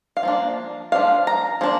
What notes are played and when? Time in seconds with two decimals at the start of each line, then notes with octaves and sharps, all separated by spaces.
0.17 F5
0.23 F3 A#3 D4
0.92 F3 D4 F5
1.27 A#5
1.61 F3 A#3 D4